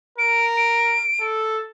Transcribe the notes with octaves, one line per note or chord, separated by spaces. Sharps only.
A#4 D7
D7
A4